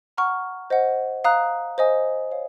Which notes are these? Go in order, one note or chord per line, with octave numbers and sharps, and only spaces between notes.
F#5 A#5 C#6 F6
C5 D#5 F#5
F5 A#5 D#6 F#6
C5 D#5 G#5 D#6
C#5 F5